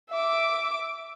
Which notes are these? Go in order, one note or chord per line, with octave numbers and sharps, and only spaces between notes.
E5 D6